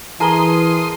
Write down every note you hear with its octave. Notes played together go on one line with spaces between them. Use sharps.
E3 G#4 A#4 A5 C6 D#6 G7